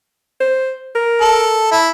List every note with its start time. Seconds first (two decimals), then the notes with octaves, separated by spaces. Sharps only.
0.41 C5
0.95 A#4
1.21 A4
1.71 E4